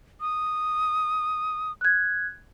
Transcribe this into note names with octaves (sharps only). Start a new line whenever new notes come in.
D#6
F#6 G#6